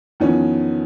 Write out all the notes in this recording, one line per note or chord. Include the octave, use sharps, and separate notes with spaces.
E2 D#3 F3 B3 C#4